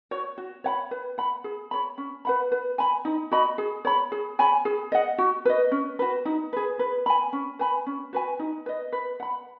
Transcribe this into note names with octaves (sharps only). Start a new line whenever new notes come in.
F#4 C#5
F#4
C#5 F#5 B5
B4
F#5 B5
G#4
C#5 B5
C#4
B4 F#5 B5
B4
G#5 B5
D#4
F#4 D#5 B5
G#4
C#5 B5
G#4
C#5 G#5 B5
G#4
D#5 F#5
F#4
B4 D#5
C#4
F#4 B4
D#4
G#4 B4
B4
G#5 B5
C#4
B4 G#5 B5
C#4
F#4 B4 G#5
D#4
B4 D#5
B4
F#5 B5